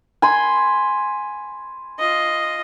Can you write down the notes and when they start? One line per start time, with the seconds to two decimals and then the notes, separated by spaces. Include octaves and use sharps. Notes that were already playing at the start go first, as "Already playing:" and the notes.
0.22 G#5 B5 C6
1.99 F4 D#5